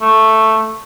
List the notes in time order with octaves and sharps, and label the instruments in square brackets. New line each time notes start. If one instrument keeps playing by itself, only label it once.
[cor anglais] A3